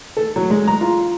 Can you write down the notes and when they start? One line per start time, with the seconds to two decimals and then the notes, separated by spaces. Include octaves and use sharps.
0.17 A4
0.36 F#3
0.50 G#3
0.67 A#5
0.81 F4